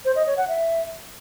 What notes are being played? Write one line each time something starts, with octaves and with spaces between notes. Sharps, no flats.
C5
D#5
C#5
F#5
E5